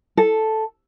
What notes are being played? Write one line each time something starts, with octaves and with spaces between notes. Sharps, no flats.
A4